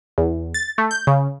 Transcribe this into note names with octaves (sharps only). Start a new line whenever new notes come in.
E2
A6
A3
G6
C#3